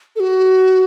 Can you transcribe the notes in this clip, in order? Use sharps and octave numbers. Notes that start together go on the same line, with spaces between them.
A4
F#4